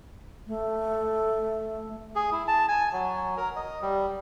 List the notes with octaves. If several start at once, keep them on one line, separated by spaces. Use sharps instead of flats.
A3
G#4
E4
A5
G#5
F#3
A#4
D#5
G3